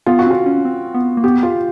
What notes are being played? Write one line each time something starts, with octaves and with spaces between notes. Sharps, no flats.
B3 F4
F#4
C4 F4
C#4
C4
B3
A#3
B3 G4
F4